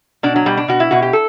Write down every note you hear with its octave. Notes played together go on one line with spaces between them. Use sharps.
B2 D4
F#3
B2 G3
D4
B2 F#4
E4
B2 F#4
G4
A4